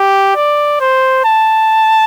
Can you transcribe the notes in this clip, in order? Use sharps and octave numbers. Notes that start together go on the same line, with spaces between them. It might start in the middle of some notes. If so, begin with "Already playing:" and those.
Already playing: G4
D5
C5
A5